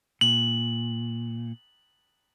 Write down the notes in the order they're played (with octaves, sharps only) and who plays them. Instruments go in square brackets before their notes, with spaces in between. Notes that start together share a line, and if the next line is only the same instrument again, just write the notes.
[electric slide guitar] A#2 [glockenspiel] F#7